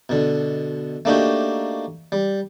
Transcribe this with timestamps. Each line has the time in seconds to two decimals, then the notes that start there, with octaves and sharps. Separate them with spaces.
0.09 B2 D3
1.05 A3 A#3 D4 D#4 F#4 G4
2.12 G3